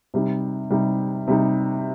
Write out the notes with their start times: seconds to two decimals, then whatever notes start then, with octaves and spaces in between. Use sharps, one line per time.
0.14 C3 G3 D#4
0.70 C3 G3 D#4
1.28 C3 G3 D#4